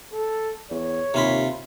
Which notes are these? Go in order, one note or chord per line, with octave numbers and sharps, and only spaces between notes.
A4
E2 C#5
D#2 C3 F4 B5